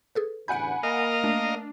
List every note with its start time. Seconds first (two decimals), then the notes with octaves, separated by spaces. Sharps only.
0.15 G#4 A4 B4
0.48 A1 E2 D3 F#5 G#5 B5 G6 D7
0.83 A#3 A#4 D#5 F5
1.24 A3 D4